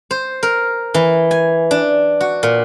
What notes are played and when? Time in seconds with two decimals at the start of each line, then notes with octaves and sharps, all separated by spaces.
0.11 C5
0.43 A#4
0.94 E3
1.31 G#5
1.71 D4
2.21 F#4
2.43 A#2